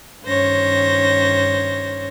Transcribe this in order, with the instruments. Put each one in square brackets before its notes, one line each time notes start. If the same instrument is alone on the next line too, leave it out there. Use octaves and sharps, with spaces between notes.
[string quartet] G2 D#3 C#4 C5 C#5 A#6